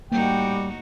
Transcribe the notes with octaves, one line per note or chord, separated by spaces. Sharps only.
A2 G3 A#3 D#4 F#4 G5